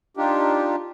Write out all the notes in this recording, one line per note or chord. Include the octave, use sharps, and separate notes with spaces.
D4 D#4 F4 G4